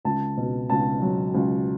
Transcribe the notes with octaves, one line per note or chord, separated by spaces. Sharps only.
C#2 A5
B2
C#2 A5
F#3
C#2